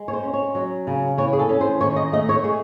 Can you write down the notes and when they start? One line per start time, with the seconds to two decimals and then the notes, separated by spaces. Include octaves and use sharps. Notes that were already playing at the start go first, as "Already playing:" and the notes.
Already playing: G#3
0.08 C#5
0.13 C5
0.23 C#4
0.33 C#5
0.55 F#3
0.87 C#3
1.18 E3 C#5
1.33 G#4
1.39 A4
1.49 C#4
1.61 C5
1.81 D#3 C#5
1.96 D#5
2.12 A3 D#5
2.29 C#5
2.44 G#3 G#4